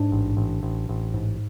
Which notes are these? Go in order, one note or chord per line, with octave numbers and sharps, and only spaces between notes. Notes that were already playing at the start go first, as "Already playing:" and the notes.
Already playing: G#2 D4
A1
A1
A1
A1
G#2